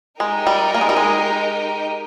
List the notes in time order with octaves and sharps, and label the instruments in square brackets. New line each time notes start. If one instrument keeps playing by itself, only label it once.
[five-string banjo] G#3 [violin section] D#4 G4 A#4 D#5 G5
[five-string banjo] G3
A#3
G#3
G3
G#3